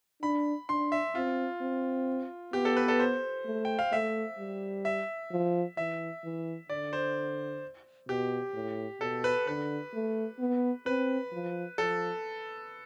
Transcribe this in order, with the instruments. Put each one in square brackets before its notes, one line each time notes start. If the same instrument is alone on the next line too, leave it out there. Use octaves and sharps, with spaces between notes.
[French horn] D4 [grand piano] B5
[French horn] D4 [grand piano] C6
[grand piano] E5
[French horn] C4 [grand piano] F4
[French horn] C4
[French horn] B3 [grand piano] G4
[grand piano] A4
B4
A4
C5
[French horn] A3
[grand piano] G5
F5
[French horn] A3 [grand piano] E5
[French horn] G3
[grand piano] E5
[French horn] F3
[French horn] E3 [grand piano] E5
[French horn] E3
[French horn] D3 [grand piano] D5
[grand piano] C5
[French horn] B2 [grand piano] G4
[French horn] A2
[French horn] B2 [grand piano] A4
[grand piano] B4
[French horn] D3 [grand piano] B4
[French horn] A3
B3
[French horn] C4 [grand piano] B4
[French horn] F3
[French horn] F3 [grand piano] A4